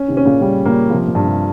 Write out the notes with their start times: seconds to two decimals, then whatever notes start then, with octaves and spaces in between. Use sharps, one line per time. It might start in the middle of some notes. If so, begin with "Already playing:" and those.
Already playing: C#4
0.08 C3 D#3
0.17 C#4
0.25 A#2 C#3
0.41 A#2 C#3 G3
0.65 A#2 C#3 A#3
0.90 C3 F3
1.07 A#2
1.15 G2
1.23 C3